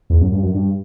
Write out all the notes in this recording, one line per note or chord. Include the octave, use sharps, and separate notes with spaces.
E2
F#2
G2
F#2
G2